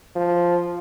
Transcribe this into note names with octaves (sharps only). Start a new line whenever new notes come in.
F3